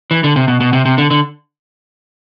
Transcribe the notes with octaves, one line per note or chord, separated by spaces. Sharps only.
E3
D3
C3
B2
B2
C3
C3
D3
D3